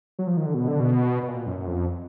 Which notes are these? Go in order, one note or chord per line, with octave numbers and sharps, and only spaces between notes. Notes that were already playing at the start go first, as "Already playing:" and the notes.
F#3
F3
D#3
D3
B2
D3
B2
B2
A#2
F#2
F2